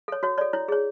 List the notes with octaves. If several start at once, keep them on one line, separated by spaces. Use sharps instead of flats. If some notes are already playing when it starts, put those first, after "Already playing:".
A4 C#5
F#4 C#5
A4 C#5 D5
E4 C#5
G#4 C#5